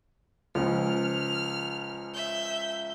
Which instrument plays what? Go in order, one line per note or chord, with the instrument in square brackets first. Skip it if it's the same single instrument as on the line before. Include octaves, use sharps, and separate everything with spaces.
[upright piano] C#2 C#3 F3 [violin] F6
[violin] E5 G6